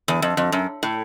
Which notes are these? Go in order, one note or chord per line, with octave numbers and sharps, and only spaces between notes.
E2
F2
F2
F#2
A2